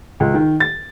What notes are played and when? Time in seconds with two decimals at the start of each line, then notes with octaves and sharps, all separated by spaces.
0.20 C#2
0.34 D#3
0.60 A6